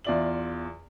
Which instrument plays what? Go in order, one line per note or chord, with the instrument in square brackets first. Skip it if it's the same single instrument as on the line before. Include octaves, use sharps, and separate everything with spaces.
[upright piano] E2 F4 D5 E5 F#7